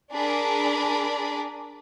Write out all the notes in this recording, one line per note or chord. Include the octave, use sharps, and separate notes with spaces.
D4 G#4 A#4 D5 B5